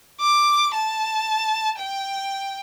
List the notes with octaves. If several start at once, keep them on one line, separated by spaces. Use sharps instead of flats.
D6
A5
G5